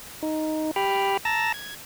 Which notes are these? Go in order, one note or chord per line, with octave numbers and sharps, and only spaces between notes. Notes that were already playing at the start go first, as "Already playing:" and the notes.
D#4
G4 G5 B5 F6
A5 A#5 E6 A6 A#6
G#6